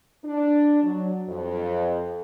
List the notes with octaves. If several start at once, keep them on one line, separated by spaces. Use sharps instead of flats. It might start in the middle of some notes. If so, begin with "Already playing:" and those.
D4
F#3
F2